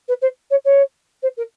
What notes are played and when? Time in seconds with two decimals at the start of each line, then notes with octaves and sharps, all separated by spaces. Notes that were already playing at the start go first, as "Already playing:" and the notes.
0.08 B4
0.21 C5
0.50 C#5
0.64 C#5
1.22 C5
1.37 A#4